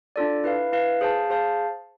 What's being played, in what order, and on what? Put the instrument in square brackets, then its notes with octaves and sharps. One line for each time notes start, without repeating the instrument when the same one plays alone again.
[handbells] D4 F4 A4 D5
E4 B4 F5
E4 B4 F5
G#4 C5 F5 A5
G#4 C5 F5 A5